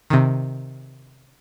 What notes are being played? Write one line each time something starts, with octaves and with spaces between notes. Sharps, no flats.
C3 D#3